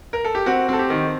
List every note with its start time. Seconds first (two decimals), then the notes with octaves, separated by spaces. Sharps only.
0.13 A#4
0.25 A4
0.35 G4
0.46 C4 F#4
0.69 C4 A4
0.79 G4
0.90 D#3